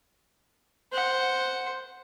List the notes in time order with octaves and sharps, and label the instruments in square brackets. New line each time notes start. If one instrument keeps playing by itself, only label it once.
[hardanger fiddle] C5 F#5